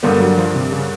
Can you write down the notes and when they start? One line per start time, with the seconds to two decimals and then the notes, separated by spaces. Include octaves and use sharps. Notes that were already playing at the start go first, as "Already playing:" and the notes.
0.03 G2 D3 G3 A#3 B3
0.20 F#3
0.38 F3
0.55 C3
0.72 C#3